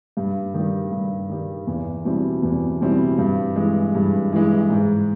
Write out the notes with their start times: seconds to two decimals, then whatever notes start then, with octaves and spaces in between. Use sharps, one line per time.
0.17 G2
0.54 D#3 G3
0.92 G2
1.30 D#3 G3
1.67 E2
2.05 B2 G3 C4 E4
2.43 E2
2.80 B2 G3 C4 E4
3.18 G2
3.56 E3 G#3
3.95 G2
4.33 E3 G#3
4.70 G#2